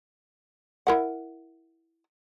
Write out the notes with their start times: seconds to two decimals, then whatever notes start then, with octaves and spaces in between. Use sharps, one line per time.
0.87 E4 A#4 F#5